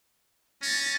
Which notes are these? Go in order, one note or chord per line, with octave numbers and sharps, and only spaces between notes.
C#4 A6 A#6